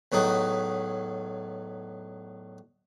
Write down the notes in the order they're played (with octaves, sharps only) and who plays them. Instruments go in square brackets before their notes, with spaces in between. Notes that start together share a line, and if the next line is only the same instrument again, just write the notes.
[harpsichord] E2 A2 F#3 D#4